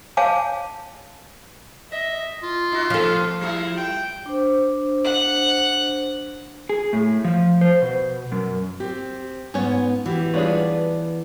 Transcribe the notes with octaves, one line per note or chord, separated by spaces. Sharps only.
C#5 F5 G#5 A5 D6
D#5 E5
F4
D#4 F#4
F3 A3 C4 A4
G3 A3 E4
G5
D4 C5
F#5
G#4
A2
F3
C5
B2
F#2
C4 G4
G#2 B3 C#4 C#5
E3 F#4 G4
G3 B3 D4 F4 G#4 C#5
D5